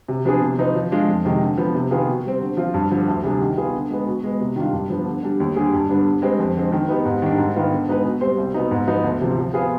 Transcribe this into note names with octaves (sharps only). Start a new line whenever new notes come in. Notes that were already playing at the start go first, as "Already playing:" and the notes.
C3
F3 B3 D4 G#4
C3
F3 C4 D#4 B4
F3
G#3 D4 F4
F2
C3 D#3 G#3
D3
F3 B3
C3
D#3 B3 F4 G#4
B2
G3 C4
D3
F3 C4 F4
G2
D3 F3
D2
C3 G3 D4 G#4
D#3
B3 F4 G#4
D3
G#3 B3
B2
G#3 B3
C3
D#3 G3 D4 F4
G2
F3 B3 D4
D3
G3 D4
D#2
D3 G3 D4 G#4
G2
D3 G3 B3 D4
D3
G#3 C4 G4 B4
F2
D3 G#3 C4
D#3
B3 D#4 G4
G#2
D#3 G3 D4
G#2
D#3 B3 F4
D3
G#3 B3 D#4 B4
B2
G3 C4 G4 C5
C2
B2 B3 D#4
G#2
F3 B3 D#4
D2
C3 F3 C4
F3
B3 F4 G#4 C5